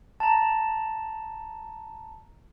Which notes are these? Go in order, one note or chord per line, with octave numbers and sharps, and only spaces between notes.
A5 A#5